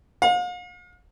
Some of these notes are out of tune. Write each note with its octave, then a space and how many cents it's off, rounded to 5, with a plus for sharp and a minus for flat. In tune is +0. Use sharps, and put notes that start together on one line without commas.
F5 +45